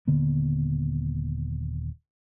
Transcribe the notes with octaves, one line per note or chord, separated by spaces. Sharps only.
D#1 D3 A#3 B3